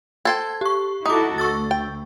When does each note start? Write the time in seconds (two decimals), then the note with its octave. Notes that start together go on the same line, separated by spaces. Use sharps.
0.25 A4 C5 G5 G#6
0.61 G4 C#6
1.06 D#4 E4 F#4 A4 D6 D#6
1.38 D2 C#6 E6 A6
1.71 G5